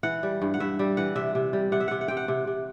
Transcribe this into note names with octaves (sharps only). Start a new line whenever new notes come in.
E3 F#5
G3
G2
F#5
G2 E5
G3
E3 F#5
C3 E5
C3
G3
C3 F#5
E5
C3 F#5
F#5
C3 G5
F#5
C3
C3